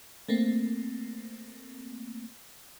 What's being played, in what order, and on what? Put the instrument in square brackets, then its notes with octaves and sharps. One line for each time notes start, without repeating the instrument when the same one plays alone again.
[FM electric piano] A3 A#3 C4